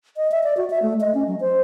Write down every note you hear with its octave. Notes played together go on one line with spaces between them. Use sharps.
D#5
E5
D5
F#4
E5
A3
D#5
C#4
F#3
C5